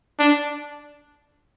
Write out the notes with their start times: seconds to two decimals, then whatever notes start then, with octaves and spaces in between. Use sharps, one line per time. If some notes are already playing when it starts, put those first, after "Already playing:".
0.19 D4